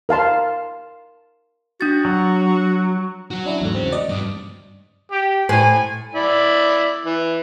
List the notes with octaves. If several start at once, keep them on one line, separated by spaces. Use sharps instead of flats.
A#4 F5 A5 C6
D4 F#4 A6
F#3
F#4 C#5
C#4 D4 E4
E2 G#2 A3
C#3 C4
D5 D#5
G2
G4
A2 C5 G#5
E4 D5
E3